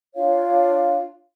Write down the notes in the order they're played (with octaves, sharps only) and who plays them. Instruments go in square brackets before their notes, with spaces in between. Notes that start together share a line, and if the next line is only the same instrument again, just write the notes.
[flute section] D4 F4 C#5 F5